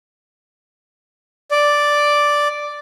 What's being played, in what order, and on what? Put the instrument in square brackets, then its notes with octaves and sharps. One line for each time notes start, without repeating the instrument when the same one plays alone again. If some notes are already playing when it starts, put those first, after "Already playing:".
[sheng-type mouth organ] D5